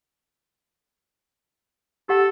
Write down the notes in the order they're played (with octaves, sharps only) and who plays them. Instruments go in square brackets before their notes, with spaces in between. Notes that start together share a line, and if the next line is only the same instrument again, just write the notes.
[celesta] G4 F#5 [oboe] A4